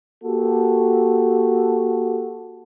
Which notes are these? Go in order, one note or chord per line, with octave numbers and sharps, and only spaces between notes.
A#3 F#4 G4 A4